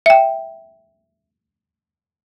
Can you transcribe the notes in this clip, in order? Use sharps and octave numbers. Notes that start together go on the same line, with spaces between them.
E5 G5